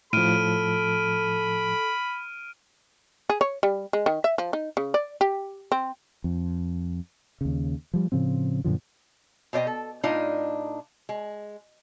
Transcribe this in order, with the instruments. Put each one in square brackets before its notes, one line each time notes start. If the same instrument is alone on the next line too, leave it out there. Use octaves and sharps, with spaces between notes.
[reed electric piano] A2 F3 [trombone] A4 [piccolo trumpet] B5 [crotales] F6 D7 D#7
[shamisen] G#4
C#5
G3
G#3
D#3
E5
F3
D#4
C#3
D5
G4
C4
[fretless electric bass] F2
D#2 C#3
F3 G3
A2 C#3 F3 C4
F#2 A#2 D3 F3
[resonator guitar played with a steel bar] B2 C5 D5 D#5 G5
A4
A2 D4 D#4 F4 D#5
G#3